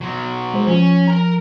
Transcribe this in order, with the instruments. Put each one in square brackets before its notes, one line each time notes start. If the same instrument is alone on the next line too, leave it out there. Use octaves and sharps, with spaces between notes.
[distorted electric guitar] B2 F#3
[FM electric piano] G#3 C5
[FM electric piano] F3 [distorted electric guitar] C#4
[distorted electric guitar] A#4 A#5